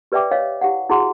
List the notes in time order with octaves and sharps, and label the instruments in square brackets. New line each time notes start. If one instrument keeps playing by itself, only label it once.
[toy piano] G4 B4 D5 E5 G5 D6
C#5 D#5 F5
E4 G4 F5 F#5
E4 F#4 G#4 F#5 C6